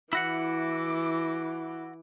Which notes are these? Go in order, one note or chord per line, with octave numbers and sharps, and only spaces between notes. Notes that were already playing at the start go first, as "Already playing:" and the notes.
E3 E4 F#4 F#5 D6